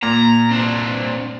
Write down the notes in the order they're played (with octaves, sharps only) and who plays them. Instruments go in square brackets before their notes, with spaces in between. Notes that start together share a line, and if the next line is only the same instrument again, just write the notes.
[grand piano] A#2 [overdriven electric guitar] A#5
[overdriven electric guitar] C4 D4